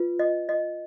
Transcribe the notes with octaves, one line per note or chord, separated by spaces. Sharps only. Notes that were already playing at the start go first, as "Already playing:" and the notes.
Already playing: F4 B4
D#5
D#5